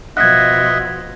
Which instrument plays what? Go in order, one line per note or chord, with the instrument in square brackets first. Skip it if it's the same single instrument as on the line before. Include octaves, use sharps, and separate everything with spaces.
[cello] B2 F3 [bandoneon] D#5 E5 F#5 [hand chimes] F#6 G#6